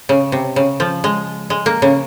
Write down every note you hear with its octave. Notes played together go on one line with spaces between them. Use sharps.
C#3
C3
C#3
F3
G#3
G#3
A#3
C#3